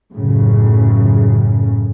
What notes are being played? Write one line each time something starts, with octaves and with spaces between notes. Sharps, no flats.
F#2 A2 C#3